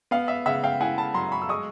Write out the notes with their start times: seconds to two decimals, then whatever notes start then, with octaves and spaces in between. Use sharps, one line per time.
0.11 B3 F5
0.28 E5
0.46 C#3 E5 F#5
0.64 F5 G5
0.81 E4 F#5 G#5
0.98 A5 B5
1.14 F#3 A#5 C6
1.32 B5 C#6
1.42 E6
1.49 G#3 C#6 D#6